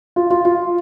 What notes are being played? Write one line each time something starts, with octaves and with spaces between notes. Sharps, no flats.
F4
F4
F4